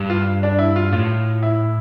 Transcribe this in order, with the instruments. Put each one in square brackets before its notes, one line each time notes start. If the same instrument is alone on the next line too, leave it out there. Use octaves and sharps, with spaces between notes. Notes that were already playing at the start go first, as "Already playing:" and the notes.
Already playing: [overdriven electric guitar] G2
[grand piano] F4
D4
E4
F4
[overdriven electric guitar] A2 [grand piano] F4
[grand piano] E4